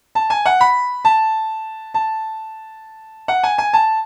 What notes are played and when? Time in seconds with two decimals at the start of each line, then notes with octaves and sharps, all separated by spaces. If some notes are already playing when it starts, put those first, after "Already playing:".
0.15 A5
0.30 G#5
0.46 F#5
0.61 B5
1.05 A5
1.94 A5
3.28 F#5
3.43 G#5
3.58 G#5
3.73 A5